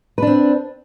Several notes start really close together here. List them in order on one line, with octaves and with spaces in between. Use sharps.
B4 D4 C4